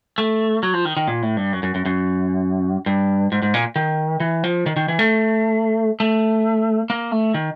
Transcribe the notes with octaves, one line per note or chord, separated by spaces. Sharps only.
A3
F#3
F3
D#3
D#3
A#2
A2
G2
F#2
F#2
F#2
F#2
G2
G#2
G#2
A#2
D#3
E3
F3
D#3
D#3
E3
A3
A3
A#3
A3
D#3